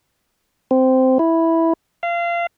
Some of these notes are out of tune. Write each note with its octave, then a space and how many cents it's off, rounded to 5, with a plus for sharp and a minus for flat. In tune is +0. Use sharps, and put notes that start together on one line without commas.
C4 -10
E4 -5
F5 -25